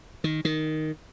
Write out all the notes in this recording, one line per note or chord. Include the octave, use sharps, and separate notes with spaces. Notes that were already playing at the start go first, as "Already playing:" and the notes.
D#3
D#3